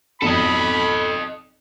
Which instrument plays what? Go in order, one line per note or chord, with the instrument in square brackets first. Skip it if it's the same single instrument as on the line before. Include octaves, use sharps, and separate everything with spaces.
[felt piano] G#1 F2 B2 [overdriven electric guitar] A4 D#5 [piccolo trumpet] B5